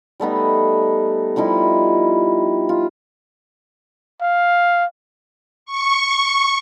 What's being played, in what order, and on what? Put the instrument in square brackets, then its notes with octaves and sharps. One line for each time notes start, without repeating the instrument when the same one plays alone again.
[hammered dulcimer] G3 A3 B3 D#4
F3 G3 D#4 E4
F4
[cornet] F5
[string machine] C#6